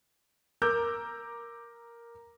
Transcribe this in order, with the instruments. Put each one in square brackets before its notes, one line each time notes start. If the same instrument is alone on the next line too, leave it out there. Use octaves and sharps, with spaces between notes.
[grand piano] A#4 A#5 D6 E6 G6